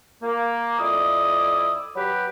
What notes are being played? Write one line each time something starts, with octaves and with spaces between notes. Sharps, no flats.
A#3
F2 E4 D5 D#6
F#3 G4 B4